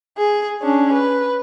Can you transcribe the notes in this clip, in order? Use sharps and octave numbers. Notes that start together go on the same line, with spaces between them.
G#4
C#4 D4
B4